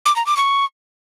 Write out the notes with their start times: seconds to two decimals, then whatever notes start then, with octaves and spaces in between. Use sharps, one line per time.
0.06 D6
0.16 A#5
0.26 D6
0.37 C#6